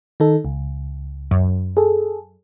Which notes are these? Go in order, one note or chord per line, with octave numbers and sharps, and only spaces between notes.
D#3 D#4 A4
C#2
F#2
G#4 A4